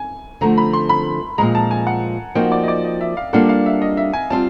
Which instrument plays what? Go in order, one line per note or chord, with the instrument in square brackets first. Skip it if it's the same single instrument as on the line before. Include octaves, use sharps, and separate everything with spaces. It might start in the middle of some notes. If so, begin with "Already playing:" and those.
Already playing: [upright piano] G#5
[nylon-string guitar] D3 F3 A3 [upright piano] A#5
[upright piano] B5
C6
B5
[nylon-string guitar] A#2 F3 G#3 [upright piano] A#5
[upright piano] A5
G#5
F#5
[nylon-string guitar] F3 A#3 D#4 F#4 [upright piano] G5
[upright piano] D5
D#5
D5
D#5
E5
F5
[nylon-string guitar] G3 A#3 D4 F4 A4 [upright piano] F#5
[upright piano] F5
E5
D#5
E5
G#5
[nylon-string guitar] G3 C4 F4 [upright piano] A5